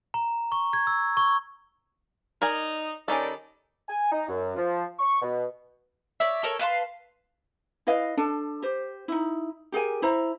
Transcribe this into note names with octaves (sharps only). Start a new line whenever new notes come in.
A#5
C#6
G#6
E6
C#6
D#4 A#4 D5 G#5
D#3 G3 C#4 D#4 A4 D5
G#5
D#4
F#2
F3
C#6
B2
C#5 D5 E5
A4 A#4 C#5
B4 F5 A5 C6
E4 B4 D#5 F5
D4 A4 A5
G4 C5
D#4 E4
G4 G#4 A#4 G#5
E4 C5 A#5